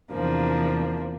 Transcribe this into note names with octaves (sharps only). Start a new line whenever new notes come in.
E2 C3 F3 A#3 D4